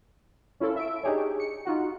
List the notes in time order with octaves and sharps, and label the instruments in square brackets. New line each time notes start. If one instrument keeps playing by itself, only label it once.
[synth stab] C#4 E4 F4 A4
E5 D7
D4 D#4 G4 G#4 C#5
C#7
D#4 F4 F#4